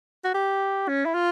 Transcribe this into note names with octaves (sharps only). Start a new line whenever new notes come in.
F#4
G4
C#4
E4
F4